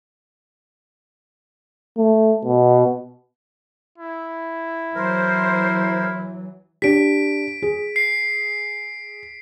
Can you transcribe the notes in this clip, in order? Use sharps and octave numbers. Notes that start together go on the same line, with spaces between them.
A3
B2
E4
E3 F#3 A#4 C5
D4 G4 B6 D7
G#4
C7